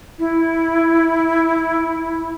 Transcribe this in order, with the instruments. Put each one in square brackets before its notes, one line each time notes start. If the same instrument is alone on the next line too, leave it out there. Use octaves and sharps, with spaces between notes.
[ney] E4